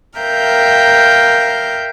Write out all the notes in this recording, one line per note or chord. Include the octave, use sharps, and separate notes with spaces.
A#4 E5 F5 G5 F6 G6